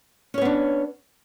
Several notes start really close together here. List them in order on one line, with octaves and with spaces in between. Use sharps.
C#4 C#5 B3 D4